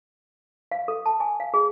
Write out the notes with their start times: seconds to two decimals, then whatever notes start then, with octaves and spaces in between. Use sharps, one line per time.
0.72 F5
0.88 A4
1.06 A5
1.20 G#5
1.40 F5
1.54 G#4